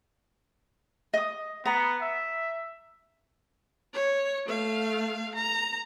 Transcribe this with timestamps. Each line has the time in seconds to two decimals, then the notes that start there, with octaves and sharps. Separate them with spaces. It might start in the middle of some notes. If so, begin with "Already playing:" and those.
1.14 D#5 D#6
1.66 B3 A#5
2.02 E5
3.94 C#5
4.47 A3 F5
5.35 A#5